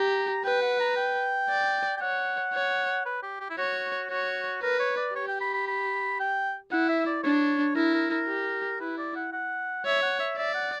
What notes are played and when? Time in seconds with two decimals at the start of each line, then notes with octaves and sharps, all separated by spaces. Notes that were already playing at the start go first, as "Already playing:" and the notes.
Already playing: G4 A#5
0.44 B4 G5
0.61 F#5
0.80 A#5
0.97 G5
1.50 D5
1.97 G5
2.01 C#5 F#5
2.54 C#5
3.06 B4
3.23 G4
3.40 G4
3.50 E4
3.58 F#4 C#5
4.10 F#4 C#5
4.62 A#4 B4
4.80 C#5
4.97 D5
5.15 G4 C#5
5.28 G5
5.41 B5
5.54 B5
5.68 B5
6.20 G5
6.71 E4 F#5
6.89 E5
7.06 D5
7.23 D4 C#5
7.76 E4 A#4
7.94 A#4
8.10 A#4
8.28 G4
8.80 E4 B4
8.98 D5
9.16 F#5
9.33 F#5
9.86 C#5 E5
10.02 F#5
10.20 E5
10.38 D5 E5
10.55 F#5